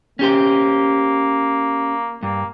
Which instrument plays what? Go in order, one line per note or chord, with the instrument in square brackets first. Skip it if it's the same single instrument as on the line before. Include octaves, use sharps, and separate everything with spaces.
[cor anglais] A#3 [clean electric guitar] C#4 G4 C5
[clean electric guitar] G2 [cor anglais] A#3